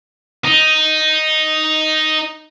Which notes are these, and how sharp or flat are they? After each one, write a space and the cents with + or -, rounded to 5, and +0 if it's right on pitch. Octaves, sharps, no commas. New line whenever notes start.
D#4 +0